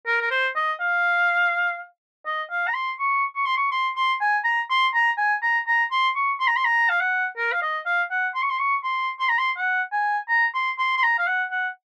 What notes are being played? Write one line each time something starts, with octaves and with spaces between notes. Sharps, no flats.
A#4
A#4
C5
D#5
F5
D#5
F5
A#5
C6
C#6
C#6
C6
C#6
C6
C6
G#5
A#5
C6
A#5
G#5
A#5
A#5
C6
C#6
C6
A#5
C6
A#5
F5
F#5
A#4
F5
D#5
F5
F#5
C6
C#6
C6
C#6
C6
C6
A#5
C6
F#5
G#5
A#5
C6
C6
C6
A#5
F5
F#5
F#5